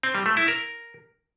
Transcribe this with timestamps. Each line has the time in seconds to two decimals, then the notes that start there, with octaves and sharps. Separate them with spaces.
0.03 C4
0.15 G3
0.26 A3
0.37 E4
0.48 A#4